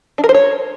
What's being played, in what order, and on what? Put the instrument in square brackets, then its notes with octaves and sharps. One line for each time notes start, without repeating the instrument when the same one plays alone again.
[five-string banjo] D4
A#4
C5
C#5